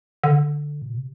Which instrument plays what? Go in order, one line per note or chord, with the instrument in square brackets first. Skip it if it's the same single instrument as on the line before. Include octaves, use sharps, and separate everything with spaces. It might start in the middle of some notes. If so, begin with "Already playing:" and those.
[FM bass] D3
A#2
C3